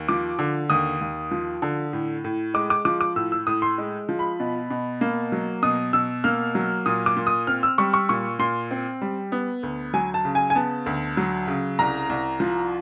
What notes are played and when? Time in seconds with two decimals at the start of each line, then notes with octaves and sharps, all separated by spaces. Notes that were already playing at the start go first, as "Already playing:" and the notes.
Already playing: D#2
0.09 F3 D6
0.39 D3
0.70 D#2 D#6
1.01 D#2
1.31 F3
1.62 D3
1.93 A2
2.24 A2
2.54 G#3 D6
2.70 D6
2.85 F3 D6
3.01 D6
3.16 A2 E6
3.32 E6
3.47 A2 D#6
3.62 C6
3.78 G#3
4.09 F3
4.19 B5
4.40 B2
4.70 B2
5.01 A#3
5.32 F#3
5.63 B2 D#6
5.93 B2 E6
6.24 A#3 F6
6.55 F#3
6.86 A#2 D#6
7.06 D6
7.17 A#2
7.27 D#6
7.47 C4 F6
7.63 E6
7.78 G3 C#6
7.94 C#6
8.09 A#2 C#6
8.39 A#2 C6
8.71 C4
9.02 G3
9.32 B3
9.63 D2
9.94 F#3 G#5
10.14 A5
10.25 C#3
10.35 G#5
10.50 G#5
10.55 B3 A5
10.86 D2
11.17 F#3
11.47 C#3
11.79 C2 A#5
12.09 C2
12.40 F3